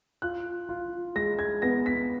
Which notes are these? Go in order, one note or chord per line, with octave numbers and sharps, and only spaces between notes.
F4 F#6
F4
G#3 A#6
G#6
B3 A#6
B6